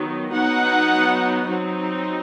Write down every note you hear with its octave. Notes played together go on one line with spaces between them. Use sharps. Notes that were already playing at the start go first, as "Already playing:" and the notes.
Already playing: D#3 F#3 B3 D#4
F#3 B3 D#4 F#5
F#3 C4 D#4